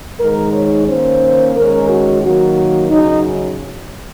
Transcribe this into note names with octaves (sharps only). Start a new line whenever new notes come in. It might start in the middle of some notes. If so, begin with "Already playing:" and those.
G#2 D#3 G#3 D#4 A#4
C#5
D#3 A#3 C#4 C5
D#3 G#3 C#4 A#4
F#4
D#3 F#3 A#3 F#4
F#2 C#3 F#3 D#4